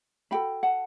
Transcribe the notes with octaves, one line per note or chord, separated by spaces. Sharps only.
D4 F#4 A4 G5 B5
F#5 A5